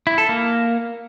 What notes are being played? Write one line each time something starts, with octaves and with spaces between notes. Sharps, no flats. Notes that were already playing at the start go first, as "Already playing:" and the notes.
E4
A4
A#3